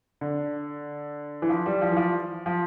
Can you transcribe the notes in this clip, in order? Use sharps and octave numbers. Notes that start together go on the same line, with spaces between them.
D3
E3
F3
G3
F3
E3
F3
F3